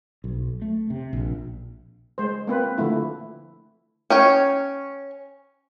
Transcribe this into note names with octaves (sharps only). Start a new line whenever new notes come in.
B1
A3
C3
A#1
G#3 C5
A#3 C4 B4
D3 F3 A3 E4
C#4 C#5 G5